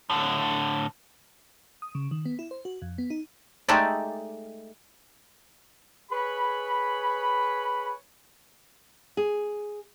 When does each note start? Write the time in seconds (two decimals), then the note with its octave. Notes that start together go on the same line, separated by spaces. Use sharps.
0.10 A2 D3
1.82 D#6
1.95 C#3
2.11 D#3
2.26 B3
2.39 E4
2.51 C5
2.65 F#4
2.82 F2
2.98 B3
3.10 D#4
3.68 G#3 A3 D#4 G4 A4 D5
6.11 G#4 B4 C#5 B5
9.17 G#4